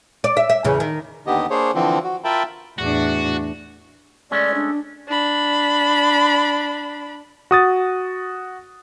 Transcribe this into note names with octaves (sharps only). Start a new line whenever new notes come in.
D5
E5
E5
E2 C#3
D#3
D#2 D3 D#3 B3 G4 D#5
A#3 D4 G#4 C5 C#5
D3 E3 F3 C4
F#4
F4 A#4 E5 G5 A5 B5
E2 A2 D4 F#4
G#3 A3 C#4 D5
D4
D4 B5
F#4 D#6 A6